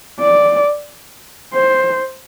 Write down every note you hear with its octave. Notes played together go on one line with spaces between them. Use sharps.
D5
C5